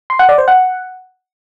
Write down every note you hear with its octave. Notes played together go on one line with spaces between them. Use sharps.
C6
F#5
D5
C5
F#5